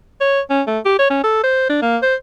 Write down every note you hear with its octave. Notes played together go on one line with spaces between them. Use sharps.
C#5
C#4
A3
G4
C#5
C#4
A4
C5
D4
A#3
C5